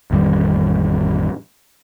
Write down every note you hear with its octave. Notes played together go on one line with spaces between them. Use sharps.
A1 F2 D#3 G3